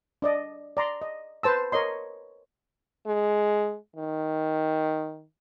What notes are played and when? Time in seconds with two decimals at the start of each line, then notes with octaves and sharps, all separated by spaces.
0.22 D4 D5 D#5
0.77 D5 A#5 C6
1.02 D#5
1.43 B4 C5 A5 E6
1.72 A#4 C#5 D#5 C6
3.07 G#3
3.96 D#3